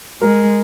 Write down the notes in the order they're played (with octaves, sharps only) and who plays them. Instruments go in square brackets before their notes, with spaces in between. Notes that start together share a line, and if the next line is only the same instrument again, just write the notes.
[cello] G#3 [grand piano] A#4